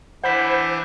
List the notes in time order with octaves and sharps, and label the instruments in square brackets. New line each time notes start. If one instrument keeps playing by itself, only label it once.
[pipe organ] E3 D4 E4 [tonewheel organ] C5 [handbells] F#5 B5 B6